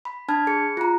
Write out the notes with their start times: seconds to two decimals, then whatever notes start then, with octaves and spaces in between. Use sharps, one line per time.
0.05 B5
0.28 D4 A5 B5 F6 G#6
0.47 G#4 C#7
0.77 F4 A#5